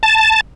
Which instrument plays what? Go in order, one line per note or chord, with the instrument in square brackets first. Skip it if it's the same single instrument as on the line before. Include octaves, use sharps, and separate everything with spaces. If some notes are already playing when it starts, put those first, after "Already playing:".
[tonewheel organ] A5